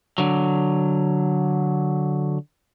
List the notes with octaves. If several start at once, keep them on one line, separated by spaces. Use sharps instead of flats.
D3 F#3